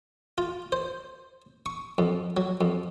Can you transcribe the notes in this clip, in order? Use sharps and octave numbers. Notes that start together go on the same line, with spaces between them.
F4
C5
C#6
F2
F#3
F2